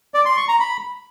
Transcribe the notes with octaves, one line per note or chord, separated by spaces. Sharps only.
D5
C6
C#6
A#5
B5